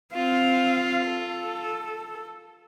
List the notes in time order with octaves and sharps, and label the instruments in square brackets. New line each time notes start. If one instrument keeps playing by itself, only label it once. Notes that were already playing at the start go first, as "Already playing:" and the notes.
[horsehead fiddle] C4 F5 [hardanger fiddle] F4
[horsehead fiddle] A4